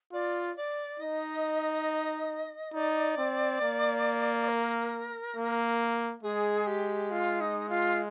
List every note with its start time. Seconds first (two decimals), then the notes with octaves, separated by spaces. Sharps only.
0.12 F4 D5
0.56 D5
1.00 D#4 D#5
2.74 D#4 D5
3.18 C4
3.62 A#3
4.48 A#4
5.36 A#3
6.23 G#3 G#4
6.67 G4
7.11 F4
7.40 D#4
7.69 F4